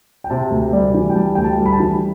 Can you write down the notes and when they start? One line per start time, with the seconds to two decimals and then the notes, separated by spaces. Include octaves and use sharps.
0.24 G5
0.30 C3 A5
0.51 D2
0.73 G3 D5
0.94 E3
1.10 G5
1.15 G3 A5
1.35 D2 G5
1.44 A5
1.59 G3
1.66 B5
1.73 A5
1.80 E3